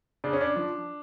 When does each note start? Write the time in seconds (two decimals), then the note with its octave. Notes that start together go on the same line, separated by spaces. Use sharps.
0.24 C#3 D4
0.33 C#4
0.41 D4
0.56 F3